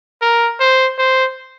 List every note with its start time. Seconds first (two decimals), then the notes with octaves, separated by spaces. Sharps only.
0.22 A#4
0.60 C5
0.98 C5